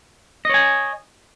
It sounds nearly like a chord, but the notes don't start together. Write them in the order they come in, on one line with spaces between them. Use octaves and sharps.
D#5 C#5 G#5